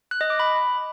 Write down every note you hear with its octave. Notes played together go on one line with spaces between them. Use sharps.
F#6
D#5
D6
B5